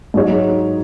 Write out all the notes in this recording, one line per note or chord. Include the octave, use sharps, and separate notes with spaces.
G#2 F#3 D#4 G#4 C#5